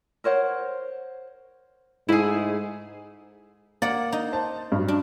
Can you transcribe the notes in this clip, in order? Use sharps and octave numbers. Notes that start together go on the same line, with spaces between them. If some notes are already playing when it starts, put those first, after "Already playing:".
A#4 C5 C#5 F#5
G#2 A3 E4 G#4
A#3 D5 F#5
D#4
C5 A5
G2 F#3
D4